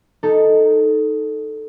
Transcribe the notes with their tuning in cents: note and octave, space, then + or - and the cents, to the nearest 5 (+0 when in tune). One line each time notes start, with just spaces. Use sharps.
D#4 +0 A4 +0